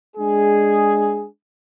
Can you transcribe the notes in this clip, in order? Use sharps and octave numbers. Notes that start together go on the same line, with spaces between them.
G#3 D4 G#4